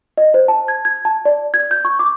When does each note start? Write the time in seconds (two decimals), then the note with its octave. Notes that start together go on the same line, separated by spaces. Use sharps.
0.18 D#5
0.34 C5
0.48 A5
0.68 G#6
0.85 G#6
1.05 A5
1.25 D5
1.54 G#6
1.71 G6
1.85 C#6
1.99 D6